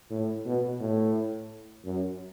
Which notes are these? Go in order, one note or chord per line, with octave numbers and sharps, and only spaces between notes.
A2
B2
A2
F#2